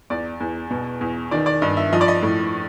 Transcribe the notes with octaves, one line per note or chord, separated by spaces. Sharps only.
E2 D5
E2
B2
E2
D#3 D5
D5
G2 D#5
E5
F3 D#5
D5
D#5
A2